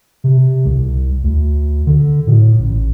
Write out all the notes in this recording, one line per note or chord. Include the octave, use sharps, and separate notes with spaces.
C3
C2
D2
D3
A2
A1